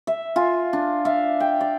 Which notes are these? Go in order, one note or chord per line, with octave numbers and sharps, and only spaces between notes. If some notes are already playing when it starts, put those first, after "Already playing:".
E5
F4 G#5
D4
E5 F5
G5
D5